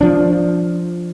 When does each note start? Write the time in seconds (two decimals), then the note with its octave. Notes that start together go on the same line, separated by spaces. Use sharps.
0.01 F3 D4